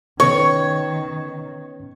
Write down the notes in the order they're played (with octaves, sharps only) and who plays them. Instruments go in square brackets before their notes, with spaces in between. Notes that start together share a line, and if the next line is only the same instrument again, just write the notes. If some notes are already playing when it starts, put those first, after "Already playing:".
[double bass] D#3 [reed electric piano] B3 C#4 B4 [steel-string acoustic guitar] C#5 [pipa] C#6